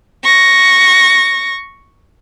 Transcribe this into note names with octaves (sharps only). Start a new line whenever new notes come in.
C#6 A#6